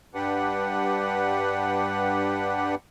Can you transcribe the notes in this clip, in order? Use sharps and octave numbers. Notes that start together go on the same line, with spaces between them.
G2 D4 G4 B4 F#5